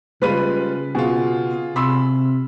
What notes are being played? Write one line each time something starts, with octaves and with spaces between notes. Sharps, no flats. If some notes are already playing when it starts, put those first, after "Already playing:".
C#3 G3 G#3 F4 B4 B5 D#7
B2 F4 G#4
C3 B5 C6 E6